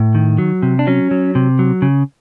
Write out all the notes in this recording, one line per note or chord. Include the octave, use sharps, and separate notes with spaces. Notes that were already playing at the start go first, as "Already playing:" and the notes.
Already playing: A2
D#3
F#3
C3
D4
F#3 C#4
F#3
C3
F#3
C#3